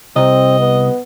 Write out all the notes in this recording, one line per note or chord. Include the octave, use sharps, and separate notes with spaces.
C2 C4 D#5
B3